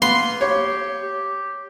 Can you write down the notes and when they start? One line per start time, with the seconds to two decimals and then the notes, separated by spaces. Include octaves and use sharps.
0.02 A#3 B3 C6
0.41 G4 C#5
1.02 G4